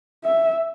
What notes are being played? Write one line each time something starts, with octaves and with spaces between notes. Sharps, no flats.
E5